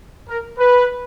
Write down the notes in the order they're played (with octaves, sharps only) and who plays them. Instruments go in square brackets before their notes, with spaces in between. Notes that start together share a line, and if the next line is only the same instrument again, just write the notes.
[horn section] A#4
B4